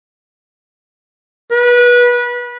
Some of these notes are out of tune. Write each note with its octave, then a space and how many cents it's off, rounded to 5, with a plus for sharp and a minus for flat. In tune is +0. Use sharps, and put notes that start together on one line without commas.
B4 -25